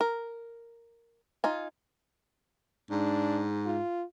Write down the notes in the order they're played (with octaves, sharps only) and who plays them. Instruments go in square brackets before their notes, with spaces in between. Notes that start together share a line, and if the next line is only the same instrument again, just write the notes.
[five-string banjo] A#4
D#4 F4 G#5
[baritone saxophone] G#2 [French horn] D4
[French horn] F4